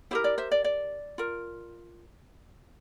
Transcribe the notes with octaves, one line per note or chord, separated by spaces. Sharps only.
E4 G4 A#4 C5
D5
C5 E5
D5
D5
F4 A#4